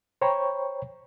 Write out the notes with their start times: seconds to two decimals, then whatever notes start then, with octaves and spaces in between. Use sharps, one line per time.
0.21 C5 C#5 G5 A#5 B5 C#6